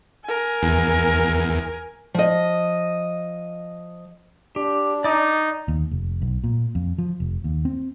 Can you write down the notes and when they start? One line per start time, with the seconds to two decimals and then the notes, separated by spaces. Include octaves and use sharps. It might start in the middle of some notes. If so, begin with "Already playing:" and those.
0.24 A#4 G#5
0.63 E2
2.14 F3 D#5
4.56 D4 G4
5.04 D#4 D5 D6
5.68 D#2
5.91 F1
6.22 B1
6.44 A#2
6.75 F2
6.98 F3
7.20 F1
7.44 D#2
7.65 C4